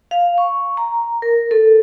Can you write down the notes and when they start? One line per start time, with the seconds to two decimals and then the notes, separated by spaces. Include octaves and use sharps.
0.11 F5
0.38 C#6
0.77 A#5
1.22 A#4
1.51 A4